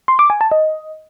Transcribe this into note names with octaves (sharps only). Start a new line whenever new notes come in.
C6
D6
G#5
A5
D#5